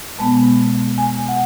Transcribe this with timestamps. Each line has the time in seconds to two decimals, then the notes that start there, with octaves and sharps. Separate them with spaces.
0.18 B2 G#3 B3 A5
0.98 G#5
1.28 F#5